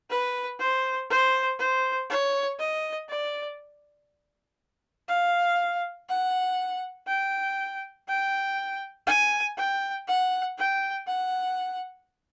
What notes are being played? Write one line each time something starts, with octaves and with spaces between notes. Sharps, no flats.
B4
C5
C5
C5
C#5
D#5
D5
F5
F#5
G5
G5
G#5
G5
F#5
G5
F#5